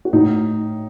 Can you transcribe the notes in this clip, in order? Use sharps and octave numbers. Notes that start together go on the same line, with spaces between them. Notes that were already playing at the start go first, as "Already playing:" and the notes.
F#4
A2 D#4